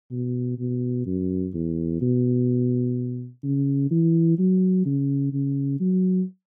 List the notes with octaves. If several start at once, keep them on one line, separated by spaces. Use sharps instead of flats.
B2
B2
F#2
E2
B2
C#3
E3
F#3
C#3
C#3
F#3